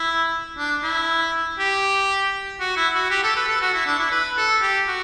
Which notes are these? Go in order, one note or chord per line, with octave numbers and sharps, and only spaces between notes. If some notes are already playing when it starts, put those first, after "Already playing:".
Already playing: E4
D4
E4
G4
F#4
E4
F#4
G4
A4
B4
A4
F#4
E4
D4
E4
B4
A4
G4
F#4